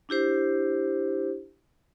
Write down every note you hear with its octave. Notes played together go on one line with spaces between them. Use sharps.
D4 E4 G4 C5